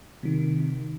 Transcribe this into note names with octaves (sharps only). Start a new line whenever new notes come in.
C3 D#3